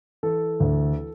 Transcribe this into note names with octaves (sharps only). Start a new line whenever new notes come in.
E3 A4
D2